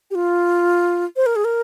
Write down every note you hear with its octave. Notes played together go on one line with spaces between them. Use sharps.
G4
F4
C5
A#4
G#4
A#4